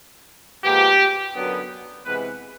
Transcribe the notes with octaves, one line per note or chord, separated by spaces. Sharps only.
A#2 F3 G#3 B3 G4
F#2 D3 F#3 B3
C3 E3 G#3 B3 B4